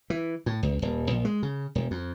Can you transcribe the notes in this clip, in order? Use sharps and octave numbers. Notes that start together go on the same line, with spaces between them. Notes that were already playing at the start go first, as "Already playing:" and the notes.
E3
A2
C#2
D#1
A#1
G#3
C#3
E1
F2